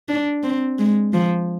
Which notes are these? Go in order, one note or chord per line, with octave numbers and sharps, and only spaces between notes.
D4
C4
G#3
F3